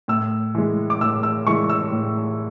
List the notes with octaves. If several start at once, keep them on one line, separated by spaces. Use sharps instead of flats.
A2 E6
E3 G#3
D6
A2 E6
E6
E3 G#3 C#6
E6
A2